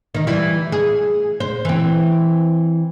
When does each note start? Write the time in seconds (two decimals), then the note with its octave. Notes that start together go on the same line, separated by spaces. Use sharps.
0.15 D#3 D#4
0.27 E3 G3 E4
0.72 G#4
1.40 C5
1.65 E3 C4